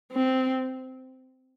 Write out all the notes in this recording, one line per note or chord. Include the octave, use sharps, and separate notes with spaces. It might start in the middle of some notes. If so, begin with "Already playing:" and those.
C4